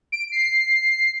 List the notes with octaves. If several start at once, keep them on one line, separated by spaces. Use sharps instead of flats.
D7
C7